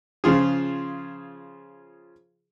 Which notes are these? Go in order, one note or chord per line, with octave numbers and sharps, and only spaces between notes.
C#3 F3 F4 G#4